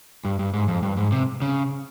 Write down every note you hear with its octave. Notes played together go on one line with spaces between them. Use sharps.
G2
G2
G#2
F2
G2
G#2
C3
C#3